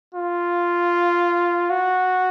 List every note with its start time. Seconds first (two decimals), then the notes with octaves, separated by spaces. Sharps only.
0.15 F4
1.70 F#4